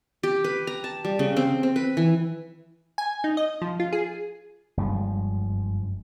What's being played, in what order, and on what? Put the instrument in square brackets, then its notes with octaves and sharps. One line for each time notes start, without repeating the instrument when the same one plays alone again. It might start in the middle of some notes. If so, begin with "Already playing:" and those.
[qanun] G4
B4
A#5
A5
G3
C#3
C4
C4
B4
E3
[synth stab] G#5
D#4
D#5
F3
F4
G#4
[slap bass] F#1 G2 F3 G#3